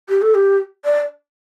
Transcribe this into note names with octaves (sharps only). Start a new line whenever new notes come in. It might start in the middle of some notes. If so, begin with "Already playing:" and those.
G4
A4
G4
D5